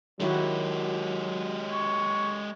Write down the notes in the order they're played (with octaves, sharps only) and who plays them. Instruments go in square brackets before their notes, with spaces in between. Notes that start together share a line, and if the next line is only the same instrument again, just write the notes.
[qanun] D#3 E4 F#4 [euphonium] F#3 [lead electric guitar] G#3 G4
[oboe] C#5